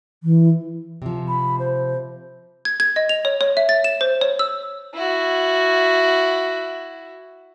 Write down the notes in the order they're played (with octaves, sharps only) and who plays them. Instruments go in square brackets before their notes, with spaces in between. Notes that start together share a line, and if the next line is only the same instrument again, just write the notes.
[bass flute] E3
[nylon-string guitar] C3 F3
[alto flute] B5
C5
[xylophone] G#6
G#6
D#5
F7
C#5
C#5
E5
A6
E7
C5
C#5
E6
[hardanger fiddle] E4 F#4